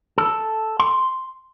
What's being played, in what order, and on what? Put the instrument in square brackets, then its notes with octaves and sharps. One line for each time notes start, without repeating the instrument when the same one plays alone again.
[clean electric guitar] A4
C6